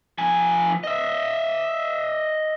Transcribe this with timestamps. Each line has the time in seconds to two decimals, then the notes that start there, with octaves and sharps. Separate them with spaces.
0.18 F3 G#5
0.84 D#5 E5